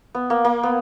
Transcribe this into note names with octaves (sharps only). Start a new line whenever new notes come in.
B3
A#3
A#3
B3